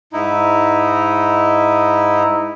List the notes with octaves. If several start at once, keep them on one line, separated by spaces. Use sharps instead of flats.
G#2 D#4 E4